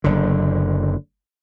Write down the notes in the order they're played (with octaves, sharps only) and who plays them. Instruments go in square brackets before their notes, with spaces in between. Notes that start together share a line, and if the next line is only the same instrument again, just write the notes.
[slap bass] F#1 D3